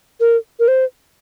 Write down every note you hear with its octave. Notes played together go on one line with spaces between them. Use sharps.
A#4
A#4
C5